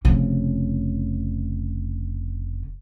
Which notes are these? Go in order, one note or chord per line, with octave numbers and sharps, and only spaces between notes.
F1 C#3